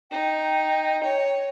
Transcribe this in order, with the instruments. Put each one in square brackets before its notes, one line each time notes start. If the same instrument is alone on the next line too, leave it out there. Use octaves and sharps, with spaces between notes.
[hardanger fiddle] D#4 [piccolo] G5
[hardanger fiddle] C#5